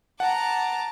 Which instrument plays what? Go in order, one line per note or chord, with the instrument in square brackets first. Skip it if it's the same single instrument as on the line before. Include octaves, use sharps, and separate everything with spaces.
[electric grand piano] F#5 [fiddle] A5 [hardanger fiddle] A#5 D6